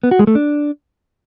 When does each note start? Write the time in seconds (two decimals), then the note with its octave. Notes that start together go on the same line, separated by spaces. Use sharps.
0.03 B3
0.11 F#4
0.19 G#3
0.27 A3
0.35 D4